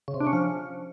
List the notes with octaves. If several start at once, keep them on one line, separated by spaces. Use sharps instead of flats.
C#3
C3
D4
C#4
F3